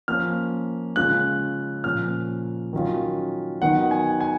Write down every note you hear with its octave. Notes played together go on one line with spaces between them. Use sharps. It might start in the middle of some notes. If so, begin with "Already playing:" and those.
F3 A#3 C#4 F4 F6
C#3 G#3 C#4 F4 F#6
A#2 F3 A#3 C#4 F6
D#3 F#3 C#4 F4
D#3 F#3 B3 D#4 F#5
G#5
G#5